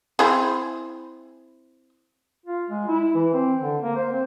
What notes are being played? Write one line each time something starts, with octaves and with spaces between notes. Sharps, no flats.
C4 E4 G#4
F4
G#3
E4
E3
C4
D3
A#3
C5
C4